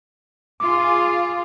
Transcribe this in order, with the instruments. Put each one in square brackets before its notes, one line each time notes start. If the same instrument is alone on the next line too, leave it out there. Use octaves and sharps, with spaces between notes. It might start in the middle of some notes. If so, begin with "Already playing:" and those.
[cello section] F4 G#4 [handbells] D6